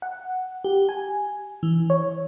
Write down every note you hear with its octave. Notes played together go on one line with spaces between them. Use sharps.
F#5
G4
G#5
E3
C#5